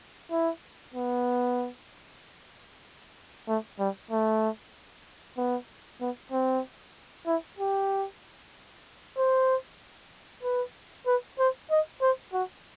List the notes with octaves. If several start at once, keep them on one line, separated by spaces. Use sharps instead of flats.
E4
B3
A3
G3
A3
B3
B3
C4
E4
G4
C5
B4
B4
C5
D#5
C5
F#4